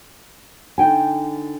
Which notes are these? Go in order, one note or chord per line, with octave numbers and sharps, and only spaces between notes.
D3 D#4 G5 G#5